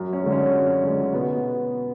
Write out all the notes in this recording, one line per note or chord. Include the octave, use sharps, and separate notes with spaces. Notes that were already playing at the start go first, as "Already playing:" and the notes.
Already playing: F#2
C#4
D3 G#3
C#4
F#2
D3 G#3
B2 B3